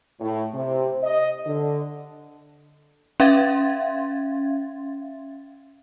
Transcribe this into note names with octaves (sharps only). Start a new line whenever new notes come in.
A2
C3
D#5
D3
C#4 E5 F5 C6 G#6 A6